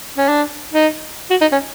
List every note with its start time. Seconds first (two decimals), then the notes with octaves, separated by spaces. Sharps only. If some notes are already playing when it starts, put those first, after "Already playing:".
0.17 C#4
0.28 D4
0.73 D#4
1.30 F#4
1.41 D#4
1.52 C#4